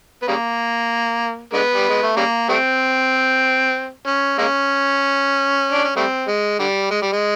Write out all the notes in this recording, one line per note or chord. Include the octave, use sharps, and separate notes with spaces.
B3
C#3 G3 A#3
D3 G#3 B3
G3
G#3
A3
C#3 G3 A#3
G3 A3 C4
C#4
G#3 A#3 C#4
D4
C#4
G3 A3 C4
G#3
D3 G3
G#3
G3
G#3